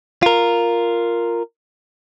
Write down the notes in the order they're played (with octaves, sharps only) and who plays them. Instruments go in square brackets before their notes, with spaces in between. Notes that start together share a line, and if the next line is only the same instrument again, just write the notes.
[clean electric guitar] F4 A#4